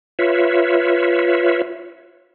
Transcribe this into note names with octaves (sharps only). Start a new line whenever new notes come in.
F4 B4 C#5 E5